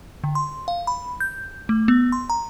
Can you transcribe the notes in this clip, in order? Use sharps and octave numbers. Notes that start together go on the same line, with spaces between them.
D3
C6
F5
B5
G6
A3
B3
C6
A#5